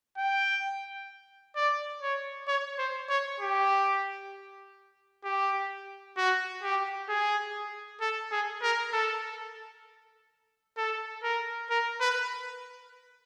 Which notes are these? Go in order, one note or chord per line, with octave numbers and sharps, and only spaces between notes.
G5
D5
C#5
C#5
C5
C#5
G4
G4
F#4
G4
G#4
A4
G#4
A#4
A4
A4
A#4
A#4
B4